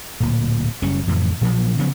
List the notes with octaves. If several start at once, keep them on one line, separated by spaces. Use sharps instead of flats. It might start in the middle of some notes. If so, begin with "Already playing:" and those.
D1 A#2
F#1 G3 C#4
F2 A2 C#3 E3
A#2 F3 F#3 A#3
C#3 F3 F#3 B3